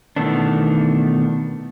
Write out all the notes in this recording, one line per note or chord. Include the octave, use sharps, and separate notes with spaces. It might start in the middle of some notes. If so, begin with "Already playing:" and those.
B2 D#3 E3 A3 B3 D4